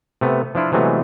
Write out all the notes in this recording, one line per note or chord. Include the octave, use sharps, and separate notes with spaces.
C3 A3 B3
F3 D4 E4 F4
C3 E3 F#3 G#3 A3 B3